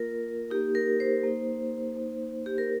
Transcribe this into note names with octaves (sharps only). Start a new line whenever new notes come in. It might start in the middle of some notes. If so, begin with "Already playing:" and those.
Already playing: A#3 F4 A#4
A#3 D#4 G4
A#4
C5
A#3 D#4
A#3 D#4
G4
A#4